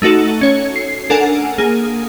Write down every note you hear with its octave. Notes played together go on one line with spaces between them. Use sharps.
A3 D#4 F#4 A4
C#4 C#5
C7
D4 A4 A#4 F#5 G#5
A#3 G#4